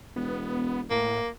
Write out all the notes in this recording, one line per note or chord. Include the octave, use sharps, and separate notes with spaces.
E1 B3
A2 A#3